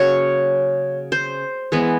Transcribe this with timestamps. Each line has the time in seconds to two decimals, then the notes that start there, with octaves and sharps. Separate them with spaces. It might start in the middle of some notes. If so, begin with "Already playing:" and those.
Already playing: C#3 F#3 A#3 C#5
1.12 C5
1.72 E3 G#3 B3